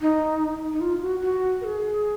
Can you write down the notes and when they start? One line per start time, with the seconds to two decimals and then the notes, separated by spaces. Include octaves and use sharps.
0.01 D#4
0.73 D#4
0.81 F4
1.02 F#4
1.21 F#4
1.61 A#4
1.64 G#4